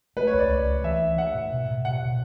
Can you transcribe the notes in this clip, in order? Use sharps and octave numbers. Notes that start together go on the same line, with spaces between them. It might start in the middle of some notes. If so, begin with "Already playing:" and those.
A3 B4
C#5
C#2
D5
C#2
A3
E3 E5
D4
A3 F#5
A2
B2
B2
B2 F#5
B2